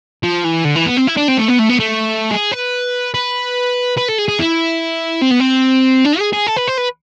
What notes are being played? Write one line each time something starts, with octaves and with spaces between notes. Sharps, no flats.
F3
E3
D3
E3
B3
C4
E4
D4
C4
A3
B3
A3
B3
A3
G#4
B4
B4
B4
A4
G#4
G#4
E4
C4
B3
C4
D4
G#4
G#4
A4
B4
C5
B4